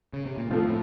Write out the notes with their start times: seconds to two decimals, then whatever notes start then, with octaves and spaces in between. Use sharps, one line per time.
0.13 C#3
0.26 C3
0.38 A#2
0.50 F2 A2 F3 A3 C4 F4
0.67 A2